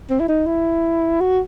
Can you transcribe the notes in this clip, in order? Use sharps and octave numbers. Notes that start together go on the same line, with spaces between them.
C4
E4
D#4
E4
F#4